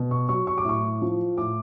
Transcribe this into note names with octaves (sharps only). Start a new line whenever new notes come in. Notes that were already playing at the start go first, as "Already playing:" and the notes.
Already playing: B2
C#6
F#3 C#6
C#6
D6
A2 C#6
F3
A2 D6